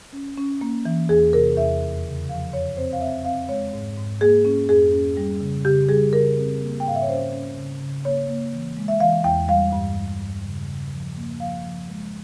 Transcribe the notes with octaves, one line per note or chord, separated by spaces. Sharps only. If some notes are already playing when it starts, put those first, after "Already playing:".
C#4
C#4
A#3
E3
E2 G#4
C3 A#4
E2 E5
F2
C#3
F3 F5
F2 C#5
C4 C5
F5
C4 E5
C4 F5
G#3 C#5
G#2
G#2
A#3 G#4
C#4
F2 G#4
C#4
G3
C#3
C#3 G4
G3 G#4
C#3 A#4
C4
A#3
G5
G#2 F5
E5
C#5
C#4 C5
C#4
C#3
C#3
A#3 C#5
A#3
E3
G#3
E5
E3 F5
E2 G5
G3 F5
G2
G2
G2
C#3
C#3
F3
A#3
F3 F5
F3
G#3